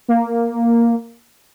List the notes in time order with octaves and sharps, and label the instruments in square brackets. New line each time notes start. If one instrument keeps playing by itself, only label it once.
[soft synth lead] A#3